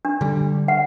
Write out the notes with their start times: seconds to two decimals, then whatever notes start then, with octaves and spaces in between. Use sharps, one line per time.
0.05 D4
0.21 D3 G3
0.68 F#5